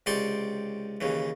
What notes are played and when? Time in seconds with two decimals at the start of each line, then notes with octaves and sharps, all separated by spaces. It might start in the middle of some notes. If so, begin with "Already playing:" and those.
0.06 C#2 C3 D5 G5 C6 C#6
1.01 D#2 C#3 E3